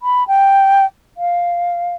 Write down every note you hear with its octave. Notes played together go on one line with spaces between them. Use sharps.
B5
G5
F5